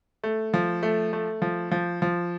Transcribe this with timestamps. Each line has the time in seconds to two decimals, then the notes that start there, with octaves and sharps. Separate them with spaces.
0.24 A3
0.54 F3
0.83 A3
1.13 A3
1.42 F3
1.71 F3
2.02 F3